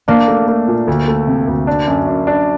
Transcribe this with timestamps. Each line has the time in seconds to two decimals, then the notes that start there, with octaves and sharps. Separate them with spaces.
0.08 A#3 D4
0.28 A3
0.48 A3
0.68 A#2
0.87 D2
1.08 A3
1.27 C3
1.48 D2
1.67 D4
1.87 F#2
2.07 F#2
2.27 D4